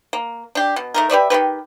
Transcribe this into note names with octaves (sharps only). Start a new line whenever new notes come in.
A#3
D4 G4
B2
A3 D#4 A#4
G4 B4 D5 E5
D#3 D#4 G4 B4